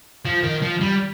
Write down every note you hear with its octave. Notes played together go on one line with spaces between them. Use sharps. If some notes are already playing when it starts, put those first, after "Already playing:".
F3
D#3
F3
G3